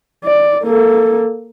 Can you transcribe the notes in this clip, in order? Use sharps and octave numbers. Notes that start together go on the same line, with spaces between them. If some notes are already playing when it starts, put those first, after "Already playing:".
D5
A#3 A4